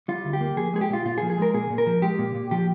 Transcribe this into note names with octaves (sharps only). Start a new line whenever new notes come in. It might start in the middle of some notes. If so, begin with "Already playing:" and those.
G3 F4
D2
G4
A#3
F3 G#4
G#3 G#4
G4
A#2 F4
A#2 F4
G#4
F3
G#4
G#3 A#4
A#2 G#4
A#2
A#4
F3
G#3 G4
A#2
A#2
F3 G4